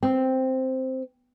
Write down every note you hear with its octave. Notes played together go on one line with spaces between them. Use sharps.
C4